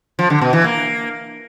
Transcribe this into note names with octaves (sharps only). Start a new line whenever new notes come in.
F3
D3
B2
E3
A#3